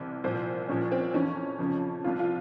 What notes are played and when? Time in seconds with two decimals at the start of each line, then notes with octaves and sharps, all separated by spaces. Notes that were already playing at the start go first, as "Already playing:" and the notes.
Already playing: C2 C3 E3
0.24 C2 A#2 F3 C5
0.68 C2 A#2 F3 C#4
0.92 C4
1.14 F2 E3 C#4
1.59 F2 C#3 F3
2.04 C2 C3 F3 F4
2.19 F4